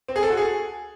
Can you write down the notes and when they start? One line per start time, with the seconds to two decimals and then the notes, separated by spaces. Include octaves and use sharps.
0.08 C4
0.16 G#4
0.23 A4
0.30 F#4
0.37 G#4